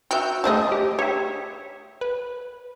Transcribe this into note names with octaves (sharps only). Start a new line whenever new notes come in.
F#4 E5 G5 F6 G6
A3 E4 G#4 C5 D#5 A5
G4
G4 C#5 E5
B4